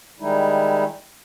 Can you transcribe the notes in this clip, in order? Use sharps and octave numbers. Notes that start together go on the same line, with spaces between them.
D#3 G3 G#3 D#4 E4